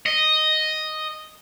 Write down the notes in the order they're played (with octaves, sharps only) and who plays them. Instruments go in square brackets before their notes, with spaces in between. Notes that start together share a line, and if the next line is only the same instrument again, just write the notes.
[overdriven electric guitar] D#5